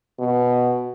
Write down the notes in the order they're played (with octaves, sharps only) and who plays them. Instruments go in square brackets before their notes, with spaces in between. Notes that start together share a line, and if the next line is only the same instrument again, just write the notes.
[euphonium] B2